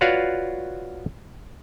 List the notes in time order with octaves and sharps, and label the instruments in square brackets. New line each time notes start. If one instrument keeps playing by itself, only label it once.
[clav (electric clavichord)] F4 F#4 B4 C#5 D5 F5